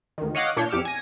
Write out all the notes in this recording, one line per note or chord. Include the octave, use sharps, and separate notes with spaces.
D2 D#3
C#5 D#5 F5 F#5 D6
A#2 D4 C#5 G6
F2 G4 D6 E6 F6 C#7
G#5 A#6